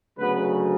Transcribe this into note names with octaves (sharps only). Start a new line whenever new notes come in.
D2 C#3 F#3 B3 B4